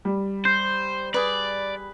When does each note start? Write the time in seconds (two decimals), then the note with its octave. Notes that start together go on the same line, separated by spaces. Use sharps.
0.05 G3
0.45 C5 G6 C7
1.14 G#4 B4 D5